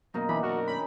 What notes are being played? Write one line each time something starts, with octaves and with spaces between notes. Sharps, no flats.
F#2 B2 A#3 D#4
E3 D4 D#4 B5
F#4 A#4
D#3 C#4 B5